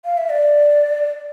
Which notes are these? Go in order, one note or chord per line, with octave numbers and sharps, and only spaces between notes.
F5
E5
D5